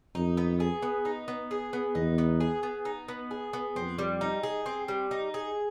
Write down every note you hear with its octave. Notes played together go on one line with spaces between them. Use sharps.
F2 D#4
B3
G#4
B3
D#4
B3
G#4
B3
E2 D#4
B3
G#4
B3
D#4
B3
G#4
B3
F2 C4
G3
D#4
G#4
C4
G3
D#4
G#4